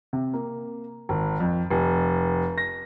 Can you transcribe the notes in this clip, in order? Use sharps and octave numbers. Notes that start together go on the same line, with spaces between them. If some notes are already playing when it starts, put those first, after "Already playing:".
C3
A#3
G#1
F2
F1
A#6